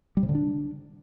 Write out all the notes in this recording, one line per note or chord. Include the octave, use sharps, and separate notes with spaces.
G3
C3
D3
D4